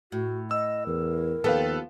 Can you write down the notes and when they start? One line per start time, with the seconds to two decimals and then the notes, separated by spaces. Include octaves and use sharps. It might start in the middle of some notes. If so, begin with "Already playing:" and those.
0.12 A2 F#4
0.51 D#5 E6
0.87 E2 A#4
1.44 D#2 F3 B3 G4 A4 B4 F5